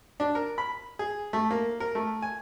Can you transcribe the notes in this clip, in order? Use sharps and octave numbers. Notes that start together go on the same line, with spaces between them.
D4
A#4
B5
G#4
A3
A#3
A#4
A3
G#5